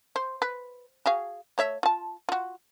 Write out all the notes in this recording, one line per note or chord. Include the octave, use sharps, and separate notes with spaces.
C5
B4
F#4 G#4 F5
A3 C#5 E5
F4 A5
F4 F#4